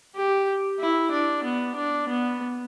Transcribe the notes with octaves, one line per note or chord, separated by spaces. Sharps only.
G4
E4
D4
B3
D4
B3